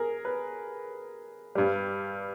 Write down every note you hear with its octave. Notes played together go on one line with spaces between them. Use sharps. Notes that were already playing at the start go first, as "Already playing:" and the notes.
Already playing: G#4 A#4
B4
G2 G3